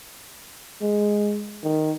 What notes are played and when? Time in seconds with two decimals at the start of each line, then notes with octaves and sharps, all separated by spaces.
0.82 G#3
1.63 D#3